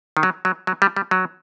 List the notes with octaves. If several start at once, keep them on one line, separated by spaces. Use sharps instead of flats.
D#3
F#3
F#3
F#3
G3
G3
F#3